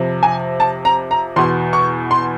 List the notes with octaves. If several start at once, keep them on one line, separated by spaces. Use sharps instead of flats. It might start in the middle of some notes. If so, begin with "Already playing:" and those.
Already playing: F2 C3 F3
G#5
A5
A#5
A#5
E2 B2 C6
C#6
C6